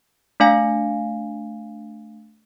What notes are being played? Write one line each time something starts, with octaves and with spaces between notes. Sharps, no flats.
A3 D4 F5 G#5